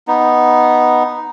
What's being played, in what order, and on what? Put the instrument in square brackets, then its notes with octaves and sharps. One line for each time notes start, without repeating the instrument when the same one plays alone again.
[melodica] B3 D#4